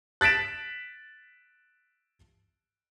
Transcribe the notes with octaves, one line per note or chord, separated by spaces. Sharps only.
F#6 A6 B6 D7 E7